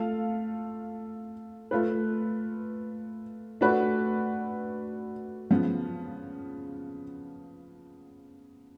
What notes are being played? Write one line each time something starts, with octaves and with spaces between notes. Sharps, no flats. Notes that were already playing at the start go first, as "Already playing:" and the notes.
Already playing: A3 F4 A4 F5
A3 F4 B4
A3 D4 F#4 B4
C#3 F3 B3